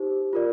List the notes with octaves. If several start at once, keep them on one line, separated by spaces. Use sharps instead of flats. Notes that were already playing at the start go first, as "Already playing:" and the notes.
Already playing: D#4 G4 C5
F4 A#4 D5